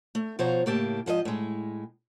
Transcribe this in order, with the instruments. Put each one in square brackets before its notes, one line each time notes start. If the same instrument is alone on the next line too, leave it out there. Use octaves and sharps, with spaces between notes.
[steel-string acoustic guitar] A3
B2 F3 C5 C#5 F5 A#5
A2 C#3 A#3 G4 A5
G#2 F3 A4 D#5
A2 G#3